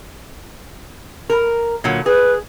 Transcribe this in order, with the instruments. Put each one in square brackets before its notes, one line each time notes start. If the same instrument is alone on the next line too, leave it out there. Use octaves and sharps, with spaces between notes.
[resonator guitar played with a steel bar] A#4
A#2 D3 F#3
[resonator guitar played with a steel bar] G#4 [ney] B4